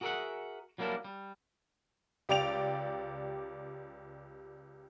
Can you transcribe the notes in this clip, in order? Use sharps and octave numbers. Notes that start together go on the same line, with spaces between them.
F#4 G#4 A#4 D5 E5 F#5
F#3 G3 A#3 D4 E4 A#4
G3
C#2 G4 D5 G5 D7 F7